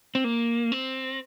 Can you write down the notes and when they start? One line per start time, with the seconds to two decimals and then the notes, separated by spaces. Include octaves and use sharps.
0.15 C4
0.24 A#3
0.72 C4